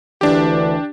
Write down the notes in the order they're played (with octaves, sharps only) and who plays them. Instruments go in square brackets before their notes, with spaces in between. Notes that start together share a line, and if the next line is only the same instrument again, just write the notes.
[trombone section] D2 E3 [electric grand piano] D4 G4